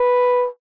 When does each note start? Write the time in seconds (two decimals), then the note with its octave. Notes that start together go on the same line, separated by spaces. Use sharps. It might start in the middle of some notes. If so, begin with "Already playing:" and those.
Already playing: B4